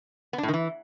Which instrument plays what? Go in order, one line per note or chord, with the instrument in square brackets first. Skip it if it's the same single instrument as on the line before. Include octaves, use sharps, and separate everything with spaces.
[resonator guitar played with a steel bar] B3
D4
A2
D#3
E3